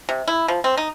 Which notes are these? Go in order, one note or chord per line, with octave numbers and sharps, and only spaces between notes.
C3
E4
F3
C4
D#4